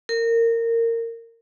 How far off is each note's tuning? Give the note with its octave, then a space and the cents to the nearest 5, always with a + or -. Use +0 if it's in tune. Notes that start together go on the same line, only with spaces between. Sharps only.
A#4 -20